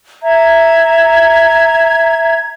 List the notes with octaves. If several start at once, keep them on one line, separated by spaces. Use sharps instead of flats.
E5 A#5 G#6